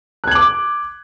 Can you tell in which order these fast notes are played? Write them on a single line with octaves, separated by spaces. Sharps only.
F#6 G#6 F#7 D6